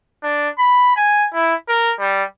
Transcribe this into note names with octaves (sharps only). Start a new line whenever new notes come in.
D4
B5
G#5
E4
A#4
G3